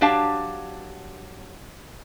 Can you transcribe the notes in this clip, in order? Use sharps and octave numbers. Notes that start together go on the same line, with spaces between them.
F#3 D4 G4 F5 A5